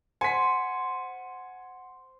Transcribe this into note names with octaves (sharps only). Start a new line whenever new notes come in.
C5 F#5 G#5 C6 B6 C#7